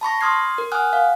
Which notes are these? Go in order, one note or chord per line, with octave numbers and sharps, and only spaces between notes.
A5 B5 C#6 A#6
C6 D#6 F6 G#6 C7
A#4
F#5 G#5 D#6 F6 F#6
F5